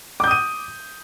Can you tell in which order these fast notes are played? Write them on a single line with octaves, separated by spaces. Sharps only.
D6 G6 D#6 D#7